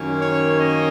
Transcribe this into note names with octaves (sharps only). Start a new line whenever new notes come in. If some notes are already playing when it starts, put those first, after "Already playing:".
Already playing: F#2 D#3 A#3 C#4
C#5
D#5